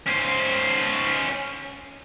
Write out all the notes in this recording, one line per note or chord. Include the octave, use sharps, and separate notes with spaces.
C#4 C5